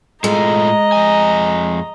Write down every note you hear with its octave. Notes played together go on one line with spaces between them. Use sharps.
A2 G#3 F4 A4 D#5 A#5
F2 G#5